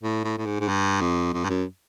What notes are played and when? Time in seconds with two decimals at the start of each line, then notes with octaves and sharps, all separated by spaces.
0.03 A2
0.24 A2
0.38 A2
0.46 G#2
0.60 G#2
0.68 G2
1.01 F2
1.34 F2
1.44 G2
1.49 F#2